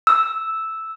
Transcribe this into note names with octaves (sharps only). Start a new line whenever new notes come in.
E6